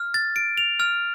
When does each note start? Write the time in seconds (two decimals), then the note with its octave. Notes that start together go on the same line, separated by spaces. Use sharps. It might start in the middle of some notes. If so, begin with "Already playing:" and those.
Already playing: F6
0.14 A6
0.36 D7
0.57 F7
0.80 F6